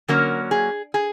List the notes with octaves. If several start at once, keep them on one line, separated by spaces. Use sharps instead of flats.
D3 F#3 A#3 C#4 A#4
G#4
G#4